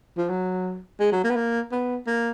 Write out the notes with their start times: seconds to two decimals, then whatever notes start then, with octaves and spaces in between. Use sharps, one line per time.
0.17 F3
0.29 F#3
1.00 G#3
1.12 F#3
1.24 A#3
1.30 B3
1.36 A#3
1.72 B3
2.07 A#3